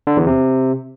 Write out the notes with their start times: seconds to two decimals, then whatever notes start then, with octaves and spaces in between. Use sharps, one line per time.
0.07 D3
0.17 E2
0.27 C3